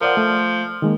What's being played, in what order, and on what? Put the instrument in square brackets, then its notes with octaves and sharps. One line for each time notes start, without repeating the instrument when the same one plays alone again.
[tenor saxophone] F3 [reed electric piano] A#4 D5 F#5
[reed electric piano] A3
D#3 G#3 A#3